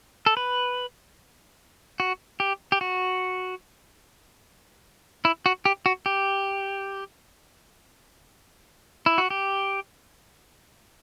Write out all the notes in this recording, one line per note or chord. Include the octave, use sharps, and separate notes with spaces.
A4
B4
F#4
G4
G4
F#4
E4
F#4
G4
F#4
G4
E4
F#4
G4